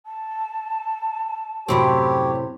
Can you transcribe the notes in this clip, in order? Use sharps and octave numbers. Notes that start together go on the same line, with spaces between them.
A5
F#2 A2 C3 C4 F#4 G4 C#5 B5